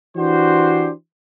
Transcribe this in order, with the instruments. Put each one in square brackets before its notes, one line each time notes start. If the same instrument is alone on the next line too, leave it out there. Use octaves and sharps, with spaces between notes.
[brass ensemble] E3 D4 F#4 G4 C5